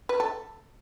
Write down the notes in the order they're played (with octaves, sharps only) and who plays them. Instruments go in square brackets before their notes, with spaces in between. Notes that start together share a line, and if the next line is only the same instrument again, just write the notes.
[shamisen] B4
A4